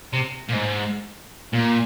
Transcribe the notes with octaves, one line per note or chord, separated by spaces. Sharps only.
C3
A#2
G#2
A#2